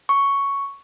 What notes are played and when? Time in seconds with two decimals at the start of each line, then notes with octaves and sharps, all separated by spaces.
0.09 C#6